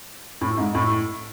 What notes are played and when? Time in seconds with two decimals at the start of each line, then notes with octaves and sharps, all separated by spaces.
0.41 A2
0.57 G#2
0.75 A2